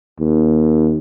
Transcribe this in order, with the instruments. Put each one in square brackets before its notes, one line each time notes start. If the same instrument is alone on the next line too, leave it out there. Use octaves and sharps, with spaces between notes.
[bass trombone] D#2